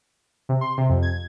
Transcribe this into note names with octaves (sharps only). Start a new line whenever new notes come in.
C3
C6
C3
F2
G#6